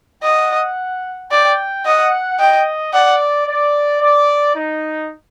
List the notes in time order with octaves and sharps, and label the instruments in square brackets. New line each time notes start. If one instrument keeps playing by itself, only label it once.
[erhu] D#5 [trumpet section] F#5
[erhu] D5 [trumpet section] G5
[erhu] D#5 [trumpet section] F#5
[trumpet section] D#5 [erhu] G5
[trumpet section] D5 [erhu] F#5
[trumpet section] D5
D5
D#4